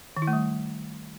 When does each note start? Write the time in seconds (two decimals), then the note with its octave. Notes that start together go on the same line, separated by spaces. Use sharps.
0.17 D#3
0.22 E4
0.27 A3
0.33 G3